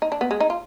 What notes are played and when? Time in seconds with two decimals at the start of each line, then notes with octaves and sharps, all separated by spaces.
0.02 D#4
0.12 D4
0.21 B3
0.31 G#3
0.40 D#4
0.50 F4